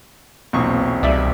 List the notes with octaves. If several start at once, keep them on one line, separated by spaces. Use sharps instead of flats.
B1 E2 A#2 C4 C#6 D#6
C2 G4 D5 E5